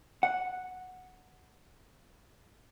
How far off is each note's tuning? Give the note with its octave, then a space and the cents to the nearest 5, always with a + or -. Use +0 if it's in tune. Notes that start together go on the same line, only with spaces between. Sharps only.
F#5 -5